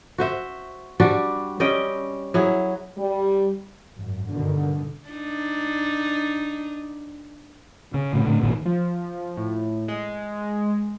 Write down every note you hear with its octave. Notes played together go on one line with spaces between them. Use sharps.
F#4 C5 E5
G3 D4 F#4
G3 C#4 D#5 G5
F#3 E4 G#4
G3
G#1 F#2
G2 B2 D3 D#3
D4 D#4
C#3
A2 C#3
A2 D3
A1 A#2 D#3
F3
A2
G#3